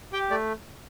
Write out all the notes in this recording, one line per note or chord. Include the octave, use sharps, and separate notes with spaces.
G4 G5
A3 D5